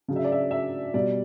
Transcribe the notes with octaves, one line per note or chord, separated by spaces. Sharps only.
C#3 F#3
E5
D5
E5
E5
B2 G3 D5